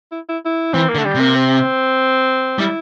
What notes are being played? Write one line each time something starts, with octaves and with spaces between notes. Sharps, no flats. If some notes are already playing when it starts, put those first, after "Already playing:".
E4
E4
E4
E3 C4
A#3
D3
A3
G3
C3
A#3
C4
G3 E4